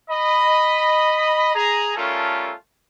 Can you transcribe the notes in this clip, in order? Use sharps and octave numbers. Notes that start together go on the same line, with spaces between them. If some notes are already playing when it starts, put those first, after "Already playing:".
D#5 B5
G#4 A#5
G3 A3 C#4 F4 A4 A#4